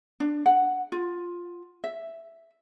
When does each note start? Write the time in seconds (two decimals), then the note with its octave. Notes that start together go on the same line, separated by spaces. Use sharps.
0.20 D4
0.46 F#5
0.92 F4
1.84 E5